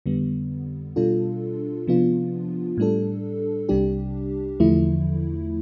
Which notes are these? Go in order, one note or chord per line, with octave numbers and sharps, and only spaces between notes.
F2 D3 G3 B3
B2 G3 D4 F4 A4
C3 F3 B3 D4 F4
A2 G3 D4 A4
C2 C3 G3 D4 G4
E2 D3 F3 A3 E4